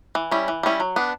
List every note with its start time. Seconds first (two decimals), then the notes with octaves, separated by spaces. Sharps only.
0.15 E3
0.31 G3 C#4 E4
0.48 E3
0.63 G3 C#4 E4
0.80 F#3
0.96 B3 D4